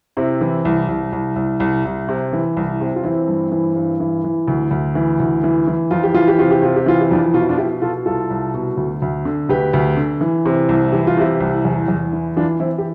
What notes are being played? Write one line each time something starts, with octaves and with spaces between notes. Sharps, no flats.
C3 C4 E4
E3
C2
C2
C2
C2
C2
C2
C3
E3
C2
C3
F4
E3 C4 E4
G2
E3
G2
E3
E3
D2
D2
E3
D2
E3
E3
F2 F4
G4
E3 F4
G4
C3 F4
G4
C3 F4
G4
E3 F4
G4
F2 D4 F4
B2 F4
E4
D4 F4
B2 E4 G4
B2 F4 A4
C2 F4 A4
C2
B2
D2
D2
D3
D2 G4 B4
D2
D3
E3
C3
C2
E3 G4
F4
C3 E4 G4
C2
E2
E2
E3
E3 D4 F4
E3 C4 E4
G4